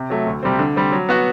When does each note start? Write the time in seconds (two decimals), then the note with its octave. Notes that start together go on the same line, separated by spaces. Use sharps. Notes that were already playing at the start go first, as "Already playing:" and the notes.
Already playing: C3
0.10 F#3 A3
0.26 D2
0.43 C3 G3 C4
0.59 D3
0.76 G3 C4
0.92 F#3
1.09 B3 F#4